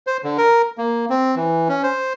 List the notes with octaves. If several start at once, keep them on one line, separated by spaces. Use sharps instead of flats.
C5
D3
A#4
A#3
C4
E3
C#4
C5